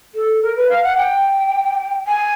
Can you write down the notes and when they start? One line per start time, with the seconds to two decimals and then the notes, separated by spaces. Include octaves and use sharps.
0.15 A4
0.42 A#4
0.56 B4
0.69 F5
0.83 F#5
0.97 G5
2.07 G#5